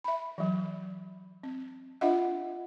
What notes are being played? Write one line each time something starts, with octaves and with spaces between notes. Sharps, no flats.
E5 B5
E3 F#3
C4
D4 F4 D#5 E5 F#5